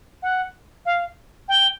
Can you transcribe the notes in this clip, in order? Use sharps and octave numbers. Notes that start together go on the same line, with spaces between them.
F#5
F5
G5